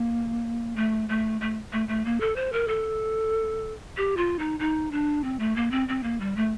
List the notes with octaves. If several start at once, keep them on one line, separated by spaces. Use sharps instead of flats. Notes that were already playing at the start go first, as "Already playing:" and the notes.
Already playing: A#3
A3
A3
A3
A3
A3
A#3
A4
C5
A#4
A4
G4
F4
D#4
D#4
D4
C4
A3
A#3
C4
C4
A#3
G3
A3